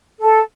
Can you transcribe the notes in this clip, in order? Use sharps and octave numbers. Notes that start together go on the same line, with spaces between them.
A4